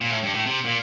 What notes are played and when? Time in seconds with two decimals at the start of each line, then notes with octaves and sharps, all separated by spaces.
0.01 A#2
0.10 A2
0.23 G2
0.34 A2
0.46 C3
0.65 A#2